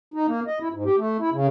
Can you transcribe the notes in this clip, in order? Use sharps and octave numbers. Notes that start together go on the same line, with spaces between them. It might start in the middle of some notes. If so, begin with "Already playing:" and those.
D#4
A#3
D#5
E4
G#2
G4
A3
E4
C#3